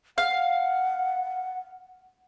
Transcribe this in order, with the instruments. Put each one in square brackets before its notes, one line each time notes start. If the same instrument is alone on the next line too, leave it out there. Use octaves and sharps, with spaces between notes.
[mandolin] F5 [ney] F#5